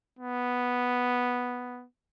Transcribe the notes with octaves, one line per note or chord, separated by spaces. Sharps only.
B3